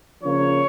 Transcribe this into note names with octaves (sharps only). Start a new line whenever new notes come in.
C#3 F3 A#3 D4 C#5